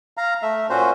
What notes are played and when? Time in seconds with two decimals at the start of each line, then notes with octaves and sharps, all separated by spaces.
0.17 F5 A#5
0.42 A3 E5
0.70 A#2 C#4 F#4 C5